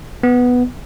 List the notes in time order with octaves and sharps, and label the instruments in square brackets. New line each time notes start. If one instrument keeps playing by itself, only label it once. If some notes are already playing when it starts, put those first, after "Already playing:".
[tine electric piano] B3